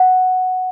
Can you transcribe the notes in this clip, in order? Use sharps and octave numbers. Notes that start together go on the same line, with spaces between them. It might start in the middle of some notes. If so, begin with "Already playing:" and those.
Already playing: F#5